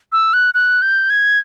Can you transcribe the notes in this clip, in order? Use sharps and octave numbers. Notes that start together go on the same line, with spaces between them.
E6
F#6
F#6
G6
G#6